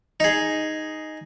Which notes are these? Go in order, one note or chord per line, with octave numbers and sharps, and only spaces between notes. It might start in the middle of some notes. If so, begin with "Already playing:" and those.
D#4 G#4